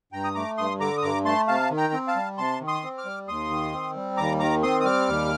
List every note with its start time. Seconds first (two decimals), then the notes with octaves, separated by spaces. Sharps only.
0.12 G2 G5 A#5
0.24 D#6
0.35 A3 A#5 D6
0.57 G2 C6 D#6
0.80 D3 A#5 D6
0.97 D#6
1.02 G2 A#5 D6
1.25 A3 A5 C6
1.48 C3 F5 A5
1.71 D#3
1.77 G5 A#5
1.93 C4
2.07 F5 A5
2.16 G3
2.37 C3 A5 C6
2.61 D#3
2.67 C6 D#6
2.83 C4
2.98 D6 F6
3.05 G3
3.28 D#2 C6 D#6
3.50 D#3
3.73 C4
3.96 G3
4.17 D#2 A#5 D6
4.40 D#3 A#5 D6
4.63 C4 C6 D#6
4.80 D#6
4.85 G3 D6 F6
5.08 D#2